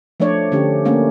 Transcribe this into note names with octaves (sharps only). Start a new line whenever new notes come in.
F3 A3 D4 C#5 D5
D3 A3 C#4 G4
A3 A#3 C#4 D4